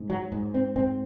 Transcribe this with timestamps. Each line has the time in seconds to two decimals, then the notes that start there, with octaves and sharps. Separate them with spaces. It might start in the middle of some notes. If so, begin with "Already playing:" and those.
Already playing: G#2
0.10 F#3
0.32 G#2
0.54 C4
0.76 G#2 C4